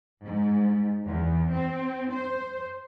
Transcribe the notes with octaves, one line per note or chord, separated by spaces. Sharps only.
G#2
E2
C4
C5